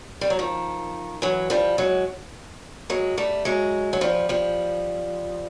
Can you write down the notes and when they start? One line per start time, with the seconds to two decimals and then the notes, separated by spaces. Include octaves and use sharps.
0.21 G3
0.30 F#3
0.39 D#3 F3
1.22 E3 F#3
1.50 F3 G3
1.78 F#3 G#3
2.90 F#3 G#3
3.18 G3 A3
3.45 F#3 G#3
3.93 F#3
4.01 F3 G3
4.29 F3 G3